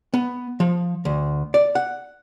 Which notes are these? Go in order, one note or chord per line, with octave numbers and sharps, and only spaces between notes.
B3
F3
D2
D5
F#5